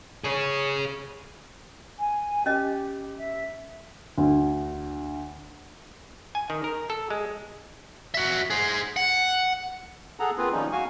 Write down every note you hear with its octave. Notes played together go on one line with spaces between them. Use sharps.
G#4 C#5
G#5
C#4 G4 D#5
E5
D2
G#5
D#3
A#4
A4
G#3
F#4 E5
G#4 C5
F#5
G#4 A4 F#5 A#5
A#3 C4 F4 G#4 B4
D#3 F3 G3 A#3 C#4 D#4
F#4 F5 G#5 C#6